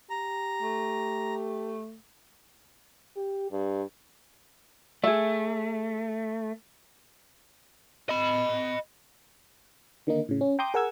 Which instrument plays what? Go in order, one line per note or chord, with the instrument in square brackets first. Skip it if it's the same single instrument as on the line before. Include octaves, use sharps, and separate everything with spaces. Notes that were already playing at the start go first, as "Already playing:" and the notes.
[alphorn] G4 [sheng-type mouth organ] A#5
[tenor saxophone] A3
[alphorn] G4
G2
[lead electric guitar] A3 [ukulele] G#4 E5
[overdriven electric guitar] D#5 B5
[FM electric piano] D3 D#3 A#3 D#4
A2 C#3
C#4
G5 A#5 C6 D6 D#6 G6
G#4 A#4 F#5 G#5 E6 G#6